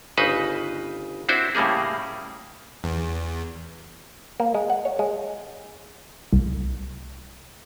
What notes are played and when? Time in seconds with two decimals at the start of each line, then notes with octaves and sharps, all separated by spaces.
0.17 G1 C#3 D#4 B4 C5
1.29 C4 D4 E4 F#4 C5
1.55 A2 C#3 G3 A#3 G#4
2.84 E2
4.40 A#3
4.54 G#3
4.70 F#5
4.85 C#5
4.99 G#3
6.33 C2